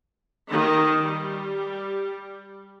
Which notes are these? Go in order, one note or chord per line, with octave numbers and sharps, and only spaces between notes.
D#3
G3